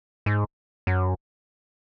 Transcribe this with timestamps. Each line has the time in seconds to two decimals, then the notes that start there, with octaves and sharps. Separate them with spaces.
0.26 G#2
0.87 F#2